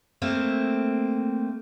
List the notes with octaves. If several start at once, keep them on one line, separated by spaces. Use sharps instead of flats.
A3 A#3 C4